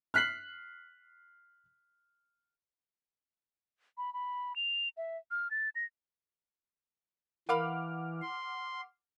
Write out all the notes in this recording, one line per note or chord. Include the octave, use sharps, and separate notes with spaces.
F6 F#6 B6 C7 F#7
B5
B5
F7
E5
F6
A6
A#6
E3 A#4 F5 F#5 B5 D6 F6
C6